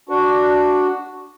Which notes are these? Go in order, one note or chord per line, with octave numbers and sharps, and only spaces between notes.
D4 F#4